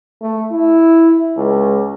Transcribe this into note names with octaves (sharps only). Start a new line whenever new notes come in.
A3
E4
C#2